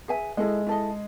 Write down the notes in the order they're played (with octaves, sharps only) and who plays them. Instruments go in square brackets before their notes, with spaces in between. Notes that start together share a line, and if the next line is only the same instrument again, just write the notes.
[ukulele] G#4 B4 E5 G#5
[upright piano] G#3 [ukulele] E4 A4 D#5
[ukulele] E4 A4 D#5